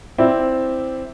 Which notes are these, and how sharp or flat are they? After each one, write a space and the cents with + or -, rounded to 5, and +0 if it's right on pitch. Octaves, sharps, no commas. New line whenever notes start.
C4 +0 E4 +0 D5 +0